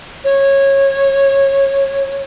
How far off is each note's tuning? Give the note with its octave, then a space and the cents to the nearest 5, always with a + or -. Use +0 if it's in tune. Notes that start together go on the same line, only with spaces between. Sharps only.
C#5 -20